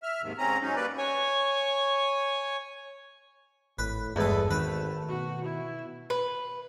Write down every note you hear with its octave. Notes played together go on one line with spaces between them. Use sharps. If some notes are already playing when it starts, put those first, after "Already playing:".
E5 F6
D#2 G#2 C3 D#3
G#2 C4 C#4 A#5
F#3 C#4 D#4
G3 A#3 B4 D5
C#5 G#5 C#6
G#1 A2 B4
E2 G2 G#3 A4 B4
G#1 D#3 A3 B4
B2 F#4
E4
B4